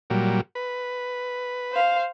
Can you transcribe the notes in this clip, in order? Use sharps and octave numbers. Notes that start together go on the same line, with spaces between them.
A#2 F#3 G3
B4
C5 F5